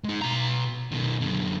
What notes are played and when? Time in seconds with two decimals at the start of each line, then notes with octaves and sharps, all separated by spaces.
0.04 G#3 D#4
0.22 B2 A#5
0.92 B2 D#3
1.21 F#2 D3